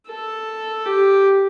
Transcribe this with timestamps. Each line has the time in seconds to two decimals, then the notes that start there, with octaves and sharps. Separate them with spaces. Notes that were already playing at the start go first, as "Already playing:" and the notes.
0.08 A4
0.85 G4